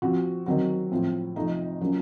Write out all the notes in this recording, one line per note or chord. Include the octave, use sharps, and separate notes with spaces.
F3 C4 F#4
D#3 F#3 C4 F#4
A2 F3 C4
F2 C3 F3 A3 D#4
C#3 F#3 A#3 F4